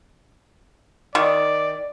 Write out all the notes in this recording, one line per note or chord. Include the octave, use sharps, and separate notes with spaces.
D#3 D5